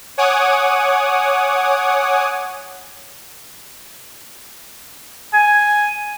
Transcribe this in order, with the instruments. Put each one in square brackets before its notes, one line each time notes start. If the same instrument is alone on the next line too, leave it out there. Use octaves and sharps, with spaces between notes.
[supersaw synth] C#5 F#5 G#5 D6 D#6
[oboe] G#5